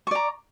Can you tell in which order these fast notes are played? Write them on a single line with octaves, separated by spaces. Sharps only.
C#6 D5 A#5